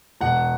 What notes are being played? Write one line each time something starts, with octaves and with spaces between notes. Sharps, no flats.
E1 F#5